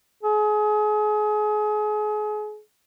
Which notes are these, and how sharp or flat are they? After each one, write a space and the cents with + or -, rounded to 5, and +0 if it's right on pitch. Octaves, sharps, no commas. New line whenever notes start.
G#4 +30